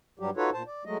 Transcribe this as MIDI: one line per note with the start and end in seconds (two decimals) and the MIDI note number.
0.19 0.30 43
0.19 0.30 54
0.19 0.30 55
0.19 0.30 67
0.37 0.50 63
0.37 0.50 65
0.37 0.50 66
0.37 0.50 69
0.37 0.50 71
0.37 0.50 73
0.53 0.63 46
0.53 0.63 72
0.53 0.63 81
0.67 0.84 74
0.85 0.97 54
0.85 0.97 56
0.85 0.97 57
0.85 0.97 75